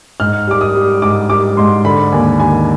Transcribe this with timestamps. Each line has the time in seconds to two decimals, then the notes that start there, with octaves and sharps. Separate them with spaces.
0.20 G#2 F6
0.47 G3 D6
0.61 D#6
0.75 G3
1.02 G#2 D6
1.30 G3 D6
1.57 G#2 C6
1.85 D3 B5
2.12 D#2 G#5
2.40 D#2 G#5